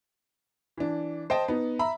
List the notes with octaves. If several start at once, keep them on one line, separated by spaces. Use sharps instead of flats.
E3 D4
C5 D#5 G5 A5
B3 D#4
E5 A#5 B5